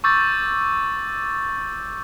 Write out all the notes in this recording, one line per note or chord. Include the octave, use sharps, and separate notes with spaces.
C#6 D6 E6 G6 A6